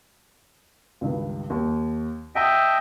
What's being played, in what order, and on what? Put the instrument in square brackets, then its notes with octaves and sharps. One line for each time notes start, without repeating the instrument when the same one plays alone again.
[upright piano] C#2 G2 D#3
D#2
[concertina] D#5 E5 G5 [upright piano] F#5 A5 D#6